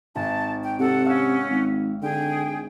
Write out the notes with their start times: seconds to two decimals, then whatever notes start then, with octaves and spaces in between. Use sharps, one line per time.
0.15 G#1 A5
0.64 G5
0.79 C3 A4 F#5
1.06 C#4 F5 F#5 E6
1.50 G#1
2.02 D3 G#4 G5